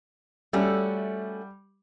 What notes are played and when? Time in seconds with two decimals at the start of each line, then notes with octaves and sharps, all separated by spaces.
0.53 G3 A3 C#4 F#4